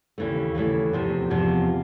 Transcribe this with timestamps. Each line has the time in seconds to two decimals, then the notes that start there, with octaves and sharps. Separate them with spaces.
0.18 D#2 C#3 E3 A3
0.55 D#2 C#3 E3 A3
0.93 E2 C3 F3
1.30 E2 C3 F3